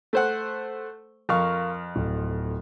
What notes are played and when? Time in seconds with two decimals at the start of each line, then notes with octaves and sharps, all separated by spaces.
0.13 A3 C5 F#5
1.29 F2 A#4 F5 C#6 F6
1.96 D1